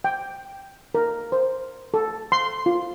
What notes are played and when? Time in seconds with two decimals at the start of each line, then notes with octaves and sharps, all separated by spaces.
0.04 G5
0.95 A#4
1.32 C5
1.94 A4
2.32 C6
2.66 F4